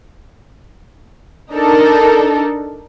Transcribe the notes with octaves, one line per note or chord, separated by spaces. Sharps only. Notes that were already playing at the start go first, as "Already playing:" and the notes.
D4 D#4 A4 A#4